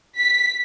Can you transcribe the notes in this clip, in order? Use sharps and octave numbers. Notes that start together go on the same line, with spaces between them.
B6